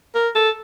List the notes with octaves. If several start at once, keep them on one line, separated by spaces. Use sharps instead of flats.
A#4
A4